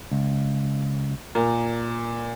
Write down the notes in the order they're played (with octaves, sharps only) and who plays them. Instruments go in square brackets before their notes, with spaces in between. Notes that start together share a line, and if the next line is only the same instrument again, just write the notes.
[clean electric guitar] C#2
[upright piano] A#2 [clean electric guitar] A#4